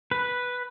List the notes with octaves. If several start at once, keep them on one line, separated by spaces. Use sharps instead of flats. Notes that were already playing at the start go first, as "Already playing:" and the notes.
B4